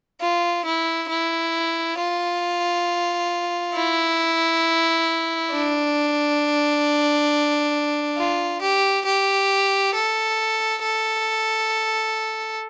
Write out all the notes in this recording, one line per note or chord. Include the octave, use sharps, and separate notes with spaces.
F4
E4
E4
F4
E4
D4
F4
G4
G4
A4
A4